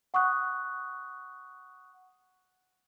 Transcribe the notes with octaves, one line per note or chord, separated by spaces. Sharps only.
F#5 C#6 D#6 F#6